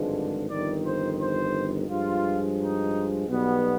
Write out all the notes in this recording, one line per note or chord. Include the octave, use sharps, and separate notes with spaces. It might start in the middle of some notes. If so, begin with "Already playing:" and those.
Already playing: G#1 G2 D3 F3 G#3
G1 F2 D#3 D5
C5
C5
G2 F3 G#3 F4
D#4
B1 B2 G3 B3